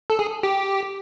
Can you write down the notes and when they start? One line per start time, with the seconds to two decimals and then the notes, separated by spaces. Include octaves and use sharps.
0.10 A4
0.19 G#4
0.43 G4